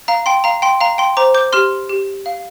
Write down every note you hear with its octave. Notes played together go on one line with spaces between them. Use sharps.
F5 A#5
G5 C6
F5 A#5
G5 C6
F5 A#5
G5 C6
C5 A#5 D6
D6 G6
G4 C6 F6
G4
F5